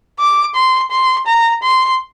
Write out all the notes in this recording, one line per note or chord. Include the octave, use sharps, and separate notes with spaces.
D6
C6
C6
A#5
C6